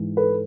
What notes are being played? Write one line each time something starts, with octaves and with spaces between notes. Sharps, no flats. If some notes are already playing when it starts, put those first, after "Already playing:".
Already playing: G#2 E3 G#3
A4 B4